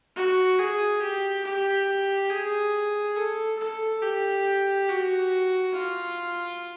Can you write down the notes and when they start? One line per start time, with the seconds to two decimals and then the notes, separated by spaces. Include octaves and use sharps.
0.16 F#4
0.59 G#4
1.01 G4
1.44 G4
2.30 G#4
3.16 A4
3.59 A4
4.02 G4
4.88 F#4
5.73 F4